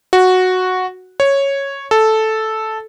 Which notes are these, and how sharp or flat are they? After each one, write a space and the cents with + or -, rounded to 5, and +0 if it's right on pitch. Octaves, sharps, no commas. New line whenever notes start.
F#4 -5
C#5 -5
A4 -5